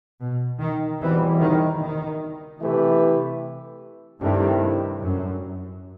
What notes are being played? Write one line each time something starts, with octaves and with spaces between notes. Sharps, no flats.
B2
D#3
E2 B2 E3 G3 C4 E4
D#3
D#3
C3 E3 A3 E4 G4 B4
G2 C3 D#3 A3 E4
F#2